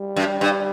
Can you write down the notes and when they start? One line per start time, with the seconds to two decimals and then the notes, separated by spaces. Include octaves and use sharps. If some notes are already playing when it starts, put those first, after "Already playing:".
Already playing: G3
0.16 F#2
0.41 G2